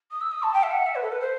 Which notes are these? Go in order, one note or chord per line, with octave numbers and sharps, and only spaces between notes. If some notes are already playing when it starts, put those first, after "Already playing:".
D#6
E6
D#6
A5
G5
E5
F#5
E5
B4
A4
B4
C5